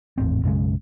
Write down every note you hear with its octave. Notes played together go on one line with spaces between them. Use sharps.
G#1 E2 A2 C4
B1 F#2 C#3 G#3